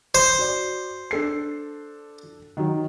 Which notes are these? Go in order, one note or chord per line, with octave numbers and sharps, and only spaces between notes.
C5
F#4 D5
D4 A4 C7
D#3 F#3